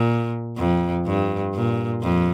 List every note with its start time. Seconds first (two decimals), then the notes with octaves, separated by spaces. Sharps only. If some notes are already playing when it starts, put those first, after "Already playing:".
Already playing: A#2
0.58 F2
1.06 G2
1.54 A#2
2.03 F2